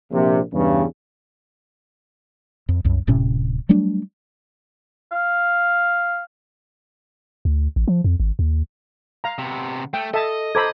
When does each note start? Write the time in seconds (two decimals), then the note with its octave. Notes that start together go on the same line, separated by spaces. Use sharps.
0.12 A#1 C3
0.54 E2 G2 C#3
2.69 F2
2.84 C2 F#2
3.07 D1 A2 C3 C#4
3.69 F#3 G3 A3 D4
5.12 F5
7.45 D2
7.76 A1
7.88 F3
8.04 F2
8.20 G#1
8.39 D#2
9.24 F5 A#5
9.39 C3 B3
9.94 A3 G5
10.14 A4 D#5 E5 A5
10.55 A4 C5 A#5 B5 D6 G#6